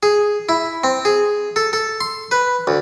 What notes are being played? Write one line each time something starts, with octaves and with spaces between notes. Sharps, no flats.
G#4
E4
C4
G#4
A4
A4
C6
B4
D2